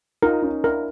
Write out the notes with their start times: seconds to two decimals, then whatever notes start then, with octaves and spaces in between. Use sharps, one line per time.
0.23 D#4 F4 A#4
0.42 C#4 D#4
0.63 D4 E4 A#4